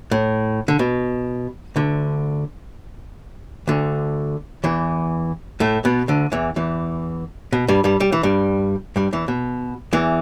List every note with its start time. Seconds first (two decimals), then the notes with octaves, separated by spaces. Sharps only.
0.11 A2
0.68 D3
0.79 B2
1.76 D2 D3
3.68 D2 D3
4.64 E2 E3
5.60 A2 A3
5.85 B2 B3
6.08 D2 D3
6.32 E2 E3
6.56 E2 E3
7.53 B2
7.68 G2 G3
7.84 G2 G3
8.00 G3
8.12 E3
8.23 G2 G3
8.96 G2 G3
9.13 E2 E3
9.28 B2
9.93 E2 E3